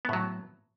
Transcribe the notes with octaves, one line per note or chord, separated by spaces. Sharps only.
A2 F#3 B3